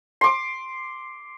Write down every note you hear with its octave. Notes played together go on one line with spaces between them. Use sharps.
C6 D6